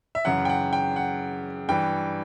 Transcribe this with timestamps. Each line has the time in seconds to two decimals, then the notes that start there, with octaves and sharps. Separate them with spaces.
0.15 E5
0.25 F#2 C#3 E3 F#5
0.45 G5
0.50 F#5
0.73 G5
0.96 F#5
1.69 G2 E3 G5